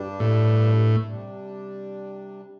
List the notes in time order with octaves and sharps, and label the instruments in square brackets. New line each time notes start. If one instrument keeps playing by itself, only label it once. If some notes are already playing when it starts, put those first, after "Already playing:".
Already playing: [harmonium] G2 G3 D4
[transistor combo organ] A2
[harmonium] C3 G3 D4